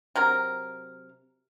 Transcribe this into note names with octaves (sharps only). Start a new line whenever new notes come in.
C3 F#3 A#4